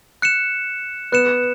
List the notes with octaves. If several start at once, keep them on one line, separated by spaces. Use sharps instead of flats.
F#6 C#7 E7
B3 F#6 C#7 E7